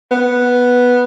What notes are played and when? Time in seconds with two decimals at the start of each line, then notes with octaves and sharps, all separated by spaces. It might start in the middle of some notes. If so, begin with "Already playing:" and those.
0.11 B3